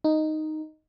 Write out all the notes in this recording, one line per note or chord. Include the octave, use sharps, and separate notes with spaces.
D#4